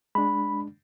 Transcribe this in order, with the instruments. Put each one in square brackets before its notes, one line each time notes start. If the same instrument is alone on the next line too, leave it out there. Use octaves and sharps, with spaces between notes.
[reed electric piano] G#3 D4 [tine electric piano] B5